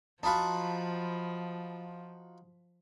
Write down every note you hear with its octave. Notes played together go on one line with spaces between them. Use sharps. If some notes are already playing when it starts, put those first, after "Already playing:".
F3 D#4 F4 F#4 A5 B5